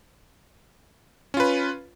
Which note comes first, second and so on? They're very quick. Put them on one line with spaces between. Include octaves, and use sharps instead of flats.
C#4 F4 B4